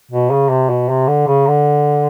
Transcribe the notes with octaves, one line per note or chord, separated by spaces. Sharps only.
B2
C#3
C3
B2
C3
D3
C#3
D3